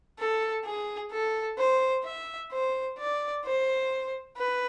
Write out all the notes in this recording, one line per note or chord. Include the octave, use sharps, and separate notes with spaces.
A4
G#4
A4
C5
E5
C5
D5
C5
B4